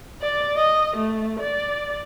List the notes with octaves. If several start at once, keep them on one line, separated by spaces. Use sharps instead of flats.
D5
D#5
A3
D5